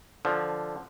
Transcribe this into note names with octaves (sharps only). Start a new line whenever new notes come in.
D3 F3